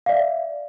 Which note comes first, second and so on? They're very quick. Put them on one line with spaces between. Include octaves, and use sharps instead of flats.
F5 D5 E5